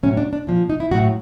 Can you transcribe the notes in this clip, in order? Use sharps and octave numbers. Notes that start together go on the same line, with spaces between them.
A2 F#3 C#4
D4
D4
A#2 F3
D#4
E4
A2 F#3 F#4